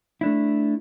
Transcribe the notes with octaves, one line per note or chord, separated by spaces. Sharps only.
A3 D4 E4